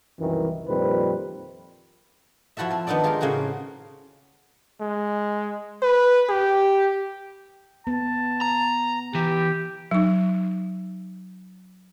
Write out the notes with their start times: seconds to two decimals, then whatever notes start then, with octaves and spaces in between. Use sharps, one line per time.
0.20 C2 F#2 D#3 E3
0.67 F2 A#2 D#3 G3 B4 C5
2.57 F3 E4 F#4 A4 E5
2.70 C4 F4
2.87 D#3 B3 D4 D#4 A4 D5
3.04 G#3 F4 G4 A4 A#4
3.21 A2 C#3 A#3 C4 F#4 G#4
4.81 G#3
5.83 B4
6.29 G4
7.87 B3 A5
8.41 A#5
9.15 E3 G4
9.91 F#3 D#4